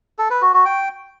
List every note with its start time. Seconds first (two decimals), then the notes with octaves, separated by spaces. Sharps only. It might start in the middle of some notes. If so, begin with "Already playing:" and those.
0.19 A4
0.30 B4
0.42 F#4
0.54 F#4
0.65 G5